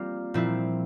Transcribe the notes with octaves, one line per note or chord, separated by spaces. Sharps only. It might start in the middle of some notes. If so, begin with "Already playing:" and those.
Already playing: G3 A#3 C4 F4
A#2 F3 C4 E4